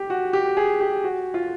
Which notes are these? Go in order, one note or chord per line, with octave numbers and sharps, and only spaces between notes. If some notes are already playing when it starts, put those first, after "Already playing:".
Already playing: G4
F#4
G4
G#4
G4
F#4
F4